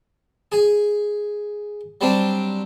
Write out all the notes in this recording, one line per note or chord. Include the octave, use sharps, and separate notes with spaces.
G#4 G#5
F#3 G3 C4 D4